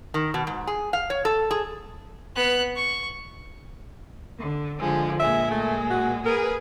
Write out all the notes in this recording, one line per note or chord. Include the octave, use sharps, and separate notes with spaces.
D#3
B2
G#2
G#4
F5
C#5
A4
G#4
B3 F#6
C#6
D3
D3 F3 G#3
A#2 G#3 E5
A3
F#4
G#4 A#4 B4